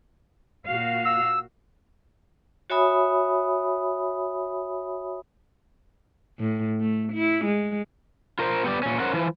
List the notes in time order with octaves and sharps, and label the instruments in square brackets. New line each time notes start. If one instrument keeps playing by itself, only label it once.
[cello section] A#2 F#4 F5
[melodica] E6
[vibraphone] F#4 C#5 E5 G#5 B5 D#6
[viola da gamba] A2
A3
E4
G#3
[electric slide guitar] F4 A#4 C5
B3 G4 D5
A#2 C#4
C#4 A#4 C5 F#5
E3 F3